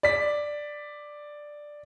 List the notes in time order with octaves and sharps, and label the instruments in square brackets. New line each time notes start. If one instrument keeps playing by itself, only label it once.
[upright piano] D5 B6